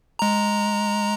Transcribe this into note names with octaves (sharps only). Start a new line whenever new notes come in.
G#3 A#5